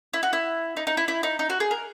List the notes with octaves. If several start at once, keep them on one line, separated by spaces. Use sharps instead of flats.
E4
F#4
E4
D#4
D#4
E4
E4
D#4
D#4
F#4
G#4
A#4